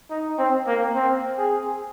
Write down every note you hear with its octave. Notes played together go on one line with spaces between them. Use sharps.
D#4
C4
A#3
C4
G#4